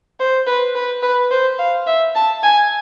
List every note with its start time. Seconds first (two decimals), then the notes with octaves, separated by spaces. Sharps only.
0.20 C5
0.47 B4
0.75 B4
1.03 B4
1.31 C5
1.59 F5
1.87 E5
2.15 A5
2.43 G#5